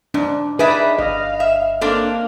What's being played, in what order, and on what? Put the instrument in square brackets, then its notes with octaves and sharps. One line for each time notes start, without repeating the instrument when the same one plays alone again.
[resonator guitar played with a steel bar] G#2 [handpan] D4
[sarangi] D#4 [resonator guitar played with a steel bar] G#4 D5 E5 [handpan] B4
[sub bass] G1 [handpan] D#5 [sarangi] F5
[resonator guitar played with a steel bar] E5
[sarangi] A#3 [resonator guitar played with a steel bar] C4 D4 A4